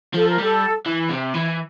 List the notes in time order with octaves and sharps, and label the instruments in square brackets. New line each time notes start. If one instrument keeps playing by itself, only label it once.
[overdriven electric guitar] F3 [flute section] A4
[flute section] A#4
[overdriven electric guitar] G3 [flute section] A4
[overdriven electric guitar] E3
C3
E3